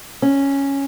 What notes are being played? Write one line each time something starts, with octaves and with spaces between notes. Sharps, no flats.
C#4